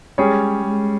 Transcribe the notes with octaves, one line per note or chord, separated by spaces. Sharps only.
G3 G#3 C#4 G#4 C#5
G#3